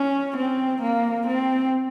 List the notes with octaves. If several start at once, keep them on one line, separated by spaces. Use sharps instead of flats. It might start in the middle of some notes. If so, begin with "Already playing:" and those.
Already playing: C#4
C4
A#3
C4